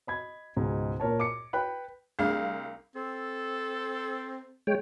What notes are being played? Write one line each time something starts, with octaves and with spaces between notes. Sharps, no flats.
D#5 B5 G#6
C#2 G#2 B2
A#2 A#4 C#5 A5
D6 C#7
B4 G5 B5 F#6
C2 A3 D4 G#4 F5
C4 A4
G#3 C#5 G5